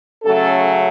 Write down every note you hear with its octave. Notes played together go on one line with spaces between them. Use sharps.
C#3 F#3 A3 C#4 A4